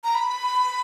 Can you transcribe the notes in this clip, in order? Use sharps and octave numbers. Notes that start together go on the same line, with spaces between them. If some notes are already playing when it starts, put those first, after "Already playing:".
A#5
B5